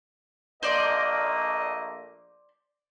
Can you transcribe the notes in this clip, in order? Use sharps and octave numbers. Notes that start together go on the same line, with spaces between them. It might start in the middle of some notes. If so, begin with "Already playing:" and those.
A#1 A3 A#3 C5 D5 D#5